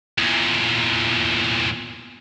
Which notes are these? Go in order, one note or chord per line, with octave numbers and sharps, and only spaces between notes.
E2 A#2